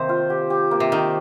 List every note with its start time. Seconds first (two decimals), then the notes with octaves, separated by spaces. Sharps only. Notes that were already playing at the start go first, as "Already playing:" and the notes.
Already playing: C3 D#3 A#3 C5
0.09 F4
0.30 G4
0.50 G4
0.71 A#3
0.80 C3
0.92 D#3 A#3